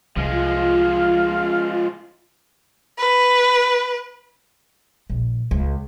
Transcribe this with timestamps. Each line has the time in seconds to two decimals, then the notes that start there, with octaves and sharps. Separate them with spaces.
0.17 C2 F3 G#3 F4 F5
2.99 B4
5.10 A#1
5.51 C#2